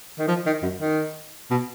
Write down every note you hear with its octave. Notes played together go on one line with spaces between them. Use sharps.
D#3
F3
D#3
F#2
D#3
B2